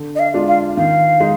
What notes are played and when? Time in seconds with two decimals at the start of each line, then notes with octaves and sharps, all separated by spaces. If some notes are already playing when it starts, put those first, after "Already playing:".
Already playing: D3
0.15 D#5
0.19 F5
0.34 G#3 D4 F4
0.48 F5
0.77 D#3 F5
1.20 G#3 D#4